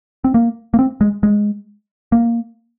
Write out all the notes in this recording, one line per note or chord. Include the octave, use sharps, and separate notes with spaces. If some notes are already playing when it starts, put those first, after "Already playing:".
C4
A#3
A#3
C4
G#3
G#3
A#3